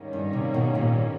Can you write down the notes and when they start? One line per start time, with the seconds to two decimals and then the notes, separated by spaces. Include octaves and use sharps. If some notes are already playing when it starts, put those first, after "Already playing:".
Already playing: G#2 D#3 G3 A#3 C#4
0.13 G2
0.33 C3
0.54 B2
0.75 A#2